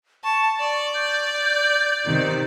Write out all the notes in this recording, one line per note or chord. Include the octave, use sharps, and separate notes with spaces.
A5 C#6
D5 C#6
G6
C3 D#3